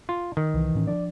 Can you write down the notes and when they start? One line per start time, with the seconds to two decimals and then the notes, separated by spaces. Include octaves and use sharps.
0.09 F4
0.37 D#3
0.54 C2 E3
0.75 A2 C#4
0.87 F3 D4 D5